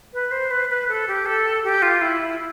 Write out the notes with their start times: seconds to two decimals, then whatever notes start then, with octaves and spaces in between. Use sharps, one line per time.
0.13 B4
0.31 C5
0.51 B4
0.70 B4
0.88 A4
1.08 G4
1.26 A4
1.64 G4
1.82 F4
2.01 E4